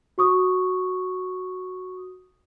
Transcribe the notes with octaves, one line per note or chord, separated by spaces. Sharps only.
F#4 C#6 D#6